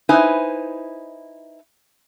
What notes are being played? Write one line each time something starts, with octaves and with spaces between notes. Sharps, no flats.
D#4 E4 B4 C5 G#5